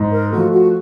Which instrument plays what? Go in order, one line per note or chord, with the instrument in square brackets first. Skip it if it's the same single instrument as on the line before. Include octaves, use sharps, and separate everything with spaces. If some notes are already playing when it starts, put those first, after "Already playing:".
Already playing: [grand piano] G#2
[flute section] A#4
[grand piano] F3 A3 [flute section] F#4
[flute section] F#4